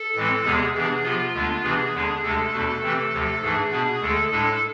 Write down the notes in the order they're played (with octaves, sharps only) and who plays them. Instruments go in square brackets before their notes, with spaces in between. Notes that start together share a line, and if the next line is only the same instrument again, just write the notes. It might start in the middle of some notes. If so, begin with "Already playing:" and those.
Already playing: [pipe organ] A4
A2 E3 G#3 C4
E2 C3 G#3 B3 G#4
C3 E3 B3 D4 G#4
C3 F3 B3 F4
D2 D3 G#3 B3 D4
C3 E3 B3 D4 G#4
E2 D3 G#3 B3 D4
D2 C3 G#3 D4 A4
E2 B2 A3 D4
C3 E3 A3 C4
D2 C3 F3
G#2 E3 A3 D4 G#4
B2 B3 D4
D2 D3 G#3 A4
A2 G#3 D4 A4